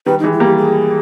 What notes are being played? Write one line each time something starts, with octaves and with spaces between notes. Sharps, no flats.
D#3 G3 B4
D#4
E3 G#3
E4
G3 A#3 G4
G#4